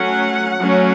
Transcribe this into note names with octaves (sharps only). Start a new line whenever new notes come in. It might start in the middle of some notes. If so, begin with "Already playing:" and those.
Already playing: F#3 A3 C#4 F#5
F#3 A3 C#4